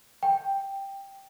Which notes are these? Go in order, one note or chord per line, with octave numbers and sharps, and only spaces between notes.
G5